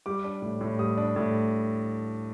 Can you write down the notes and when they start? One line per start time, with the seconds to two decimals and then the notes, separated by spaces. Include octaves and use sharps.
0.06 G3 D6
0.24 D4
0.42 A2
0.61 A2
0.79 G3 D#6
0.97 D4
1.16 A2